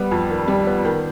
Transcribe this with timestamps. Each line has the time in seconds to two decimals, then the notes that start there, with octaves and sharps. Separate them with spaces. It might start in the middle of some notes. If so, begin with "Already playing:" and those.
Already playing: G3 B3
0.11 F2
0.30 D#3
0.48 G3
0.67 B3
0.85 D#3